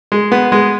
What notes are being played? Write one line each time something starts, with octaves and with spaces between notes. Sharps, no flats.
G#3
B3
G#3